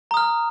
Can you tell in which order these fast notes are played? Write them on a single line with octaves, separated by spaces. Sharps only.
A#5 D#6 F6